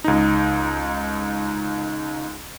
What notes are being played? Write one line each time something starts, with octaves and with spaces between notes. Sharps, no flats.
C#2 D#4